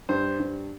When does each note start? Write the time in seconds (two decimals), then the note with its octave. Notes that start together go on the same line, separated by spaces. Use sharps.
0.09 G2 C5
0.39 G2